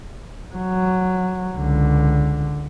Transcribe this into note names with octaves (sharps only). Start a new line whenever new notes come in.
F#3
C#2 D3